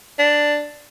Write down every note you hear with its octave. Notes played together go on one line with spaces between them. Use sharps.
D4